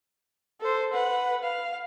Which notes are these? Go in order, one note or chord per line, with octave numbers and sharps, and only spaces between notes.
A4 C5
B4 F#5
F5